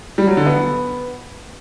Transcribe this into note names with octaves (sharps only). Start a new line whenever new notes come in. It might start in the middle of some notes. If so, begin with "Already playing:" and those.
G3
F#3
D3
B3